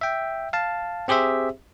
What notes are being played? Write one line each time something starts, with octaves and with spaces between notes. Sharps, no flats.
E5 G5
F5 A5
C4 G4 G#4 C5 E5